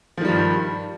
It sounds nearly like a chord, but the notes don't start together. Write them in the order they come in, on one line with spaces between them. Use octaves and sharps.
F3 D#3 G3 G2